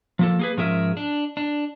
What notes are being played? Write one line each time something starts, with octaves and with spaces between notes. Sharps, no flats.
F3 A#3 A4
A#3 G#4 B4
G#2 F3 C#4 G#4 A#4 E5
D4
D4